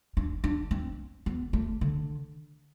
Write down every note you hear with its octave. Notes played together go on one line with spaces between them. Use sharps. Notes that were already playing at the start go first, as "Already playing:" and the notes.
D4
D4
C4
B3
A3
D3